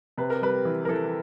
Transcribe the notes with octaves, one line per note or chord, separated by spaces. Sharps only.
C3 B4
A#4
G3 B4
E3
A#4
E3 A4